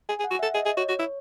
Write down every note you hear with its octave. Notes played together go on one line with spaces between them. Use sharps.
G#4 G#5
G#4
F#5
F#4
A4 E5
G#4 D#5
G#4
F#4 C#5
F#4
E4